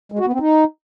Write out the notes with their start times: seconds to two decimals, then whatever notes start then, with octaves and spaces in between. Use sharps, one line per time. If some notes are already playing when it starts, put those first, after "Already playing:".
0.12 G#3
0.19 F#4
0.26 B3
0.33 C4
0.40 D#4